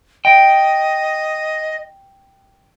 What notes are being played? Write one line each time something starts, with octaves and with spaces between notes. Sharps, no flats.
D#5 G5